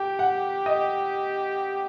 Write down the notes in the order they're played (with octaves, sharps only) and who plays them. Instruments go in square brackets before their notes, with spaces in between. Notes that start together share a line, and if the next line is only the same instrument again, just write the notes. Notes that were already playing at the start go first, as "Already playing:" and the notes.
Already playing: [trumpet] G4 [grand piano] G5
[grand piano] F#5
D#5